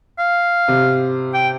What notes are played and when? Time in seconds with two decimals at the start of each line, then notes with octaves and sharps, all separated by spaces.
0.19 F5
0.68 C3
1.34 G5